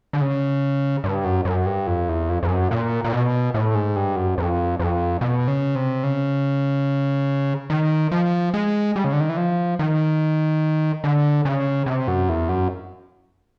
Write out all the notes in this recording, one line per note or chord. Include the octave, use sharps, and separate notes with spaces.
D3
C#3
G2
F#2
F#2
G2
F2
E2
F2
F2
F#2
A#2
A#2
B2
A2
G#2
G2
F#2
F2
F2
B2
C#3
C3
C#3
D#3
F3
G#3
G3
C#3
D3
D#3
E3
F3
D#3
D3
C#3
C3
F#2
E2
F#2